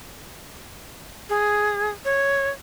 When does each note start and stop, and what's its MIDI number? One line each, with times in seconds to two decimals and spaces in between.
1.30 1.91 68
2.05 2.50 73